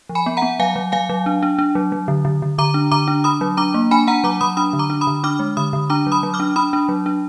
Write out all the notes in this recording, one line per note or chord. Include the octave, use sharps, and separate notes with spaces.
F3
G#5 B5
B3
F#5 A#5
B3
F#3 F5 G#5
F#3
F#3 F5 G#5
F#3
D4
D4
D4
F#3
F#3
D3
D3
D3
D3 A#5 D6
D4
D3 A#5 D6
D4
D4 B5 D#6
F#3
D4 A#5 D6
A#3
D4 G#5 B5
D4 F#5 A#5
F#3 A#5 D6
F#3 B5 D#6
D4 B5 D#6
D3
A#5 D6
D4
B5 D#6
D3
D4 D6 F6
G#3
D3 B5 D#6
D3
D4 A#5 D6
F#3
B5 D#6
F#3
D6 F6
D4
D4 B5 D#6
D4
F#3
D4